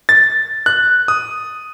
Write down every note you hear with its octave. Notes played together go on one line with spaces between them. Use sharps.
A6
F#6
D#6